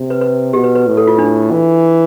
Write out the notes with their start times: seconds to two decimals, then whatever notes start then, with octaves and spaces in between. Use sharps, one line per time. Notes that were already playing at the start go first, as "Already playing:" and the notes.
Already playing: C3
0.10 B4
0.21 B4
0.53 B2 G4
0.64 B4
0.75 B4
0.87 A2
0.97 A4
1.07 F4
1.18 D4
1.51 E3